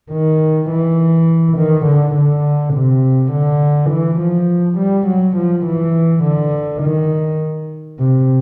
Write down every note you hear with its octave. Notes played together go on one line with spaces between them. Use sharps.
D#3
E3
D#3
D3
D3
C3
D3
E3
F3
G3
F#3
F3
E3
D3
D#3
C3